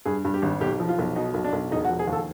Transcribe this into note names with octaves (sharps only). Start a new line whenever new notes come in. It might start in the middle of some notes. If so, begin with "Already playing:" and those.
G2 G#4
G2
G4
G#1
B1 G4
F3
F4
B1
B2 D#4
B1
D4
B1
E1 D#4
F#4
F3
G#4
D#2
A4